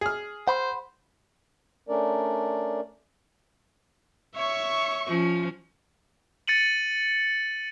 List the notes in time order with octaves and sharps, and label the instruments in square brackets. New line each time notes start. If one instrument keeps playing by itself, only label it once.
[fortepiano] G#4 F6
[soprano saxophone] C5 [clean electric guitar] F#5 B5 C6
[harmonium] A3 C#4 D4 A#4 D5
[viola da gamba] C#5 [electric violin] E5 C#6
[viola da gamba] F3 C#4 F4
[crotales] A6 C#7 D#7 F#7